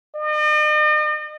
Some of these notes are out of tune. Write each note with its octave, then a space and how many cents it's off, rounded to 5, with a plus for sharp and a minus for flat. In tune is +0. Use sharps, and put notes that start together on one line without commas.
D#5 -45